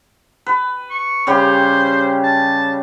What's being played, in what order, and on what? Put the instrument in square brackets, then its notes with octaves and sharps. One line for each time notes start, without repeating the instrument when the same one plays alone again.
[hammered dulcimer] B4
[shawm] C#6
[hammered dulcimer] C#3 G3 G4 [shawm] C5
[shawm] A5